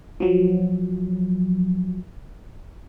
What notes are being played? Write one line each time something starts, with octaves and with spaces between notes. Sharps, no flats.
F3 F#3